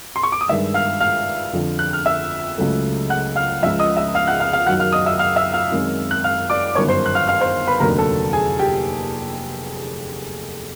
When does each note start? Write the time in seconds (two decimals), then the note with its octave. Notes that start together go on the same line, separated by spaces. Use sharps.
0.16 C6
0.23 C#6
0.32 D6
0.41 D#6
0.48 G2 D#3 G#3 E5 E6
0.74 F5 F6
1.00 F5 F6
1.53 F2 D3 F3
1.79 F#6
1.93 F6
2.05 E5 E6
2.58 C#2 C#3 F#3 A3
3.10 F#5 F#6
3.36 F5 F6
3.63 C#2 C#3 F3 E5 E6
3.79 D#5 D#6
3.97 E5 E6
4.15 F5 F6
4.27 F#5 F#6
4.40 F5 F6
4.53 F5 F6
4.67 F#2 D#3 F#3 F#5 F#6
4.80 F5 F6
4.92 D#5 D#6
5.06 E5 E6
5.19 F5 F6
5.36 E5 E6
5.53 F5 F6
5.71 F#2 D#3 G#3 C4
6.11 F#6
6.24 F5 F6
6.50 D5 D6
6.75 G1 F#2 D#3 C#5 C#6
6.88 C5 C6
7.06 F#6
7.15 F5 F6
7.28 F5 F6
7.41 C5 C6
7.67 B4 B5
7.80 F1 D#2 D3 F#3 A#4 A#5
7.98 A4 A5
8.33 G#4 G#5
8.59 G4 G5